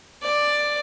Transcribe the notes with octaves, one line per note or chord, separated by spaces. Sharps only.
D5